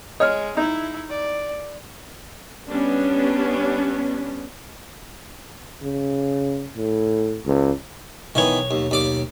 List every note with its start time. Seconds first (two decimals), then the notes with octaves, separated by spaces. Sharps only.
0.20 G#3 C#5 D#5 F6
0.57 D#4 E4
1.09 D5
2.68 G3 B3 C#4 D4
5.82 C#3
6.77 A2
7.46 C#2
8.35 B1 D#3 E3 B3 C#5
8.71 D#2
8.91 D#2 D5 D6